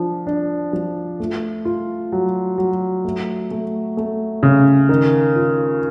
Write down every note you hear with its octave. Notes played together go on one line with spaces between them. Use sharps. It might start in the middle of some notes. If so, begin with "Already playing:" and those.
Already playing: F3 D4
D4
F3
A3
F4
F#3
F#3
A3
A3
A3
C#3
D#3
F4